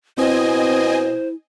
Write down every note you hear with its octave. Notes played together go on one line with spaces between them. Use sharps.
B2 C4 E4 C5 D#5 G#5